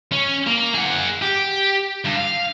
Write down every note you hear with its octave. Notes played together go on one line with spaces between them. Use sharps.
C#4
A#3
G#4 F#5
G4
G2
F5